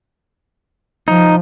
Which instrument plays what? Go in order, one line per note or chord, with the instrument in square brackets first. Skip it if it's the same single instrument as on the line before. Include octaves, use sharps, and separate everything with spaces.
[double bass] F3 [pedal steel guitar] D#4